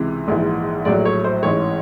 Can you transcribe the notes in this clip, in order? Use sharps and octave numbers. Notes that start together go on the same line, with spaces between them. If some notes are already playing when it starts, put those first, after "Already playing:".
Already playing: C#2 C3 E3
A#1 G#2 E3
A#1 A2 F#3 D5
C#5
C5
A1 G#2 E3 C#5